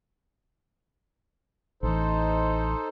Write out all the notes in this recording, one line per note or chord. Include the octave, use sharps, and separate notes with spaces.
A1 E3 D#4 A4 C5